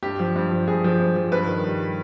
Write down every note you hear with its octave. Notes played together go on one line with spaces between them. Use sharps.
G2 G4
F3
G2
F3
G2 G#4
F3
G2
F3
G2 B4
D#3
G3